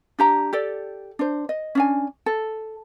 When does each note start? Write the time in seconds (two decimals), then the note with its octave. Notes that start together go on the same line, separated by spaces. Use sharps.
0.19 D4 G4 A#5
0.53 G4 A4 D5
1.19 D4 C5
1.49 D#5
1.75 C#4 D4 G#5
2.26 A4